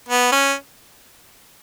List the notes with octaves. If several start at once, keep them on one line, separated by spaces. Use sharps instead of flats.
B3
C#4